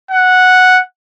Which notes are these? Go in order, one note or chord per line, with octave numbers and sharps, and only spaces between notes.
F#5